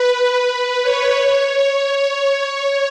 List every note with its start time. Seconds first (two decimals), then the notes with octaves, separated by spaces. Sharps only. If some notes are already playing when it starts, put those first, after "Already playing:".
Already playing: B4
0.18 B4
0.50 B4
0.83 C#5
2.44 C#5